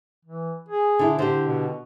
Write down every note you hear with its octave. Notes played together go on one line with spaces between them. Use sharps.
E3
G#4
D3 E4
D3 G4 C5
B2